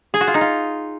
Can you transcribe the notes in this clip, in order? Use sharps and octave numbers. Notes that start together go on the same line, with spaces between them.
G#4
F#4
F4
D#4
F4